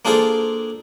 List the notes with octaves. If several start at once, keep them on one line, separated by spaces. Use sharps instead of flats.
A#3 D4 F4 G#4 A4 C5